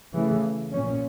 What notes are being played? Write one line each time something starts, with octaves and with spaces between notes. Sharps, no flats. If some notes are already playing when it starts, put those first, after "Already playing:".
C#3 E3 A3
A#2 F3 C#4